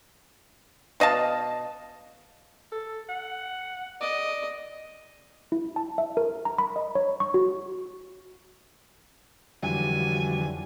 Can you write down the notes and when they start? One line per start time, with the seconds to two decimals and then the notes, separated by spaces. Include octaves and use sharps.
1.00 B2 D#5 F5 A5
2.72 A4
3.09 F#5
4.01 D5 D#5
5.52 E4
5.76 A5
5.98 E5
6.17 A#4
6.45 A#5
6.58 B5
6.76 D#5
6.95 C#5
7.20 C#6
7.34 F#4
9.63 F2 D3 E3 F#3 G3 G#5